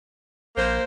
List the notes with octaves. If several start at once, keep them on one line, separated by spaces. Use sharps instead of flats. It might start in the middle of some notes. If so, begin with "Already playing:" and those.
A#1 A#3 C5